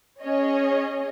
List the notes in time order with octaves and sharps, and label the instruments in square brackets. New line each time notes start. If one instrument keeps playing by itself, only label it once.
[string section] C#4 G#4 C#5 D#5